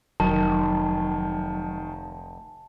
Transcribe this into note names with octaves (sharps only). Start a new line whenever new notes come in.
F1 D#3 F#3 A5